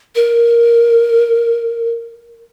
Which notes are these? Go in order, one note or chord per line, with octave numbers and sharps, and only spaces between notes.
A#4